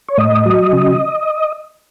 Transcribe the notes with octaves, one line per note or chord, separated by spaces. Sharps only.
C#5
A2 D#5
F#3
C#3